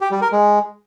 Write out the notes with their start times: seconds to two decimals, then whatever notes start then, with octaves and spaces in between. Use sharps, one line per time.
0.01 G4
0.11 G3
0.22 A#4
0.32 G#3